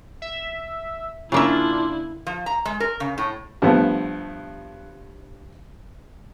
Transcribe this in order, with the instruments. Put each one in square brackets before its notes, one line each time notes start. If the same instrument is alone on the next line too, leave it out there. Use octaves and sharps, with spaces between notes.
[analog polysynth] E5
[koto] C#3 A#3 E5 [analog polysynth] D4 F4 [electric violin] E4
[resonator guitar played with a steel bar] F3
A#5
G#3
A#4
C#3
A2
[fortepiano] G2 F3 A3 B3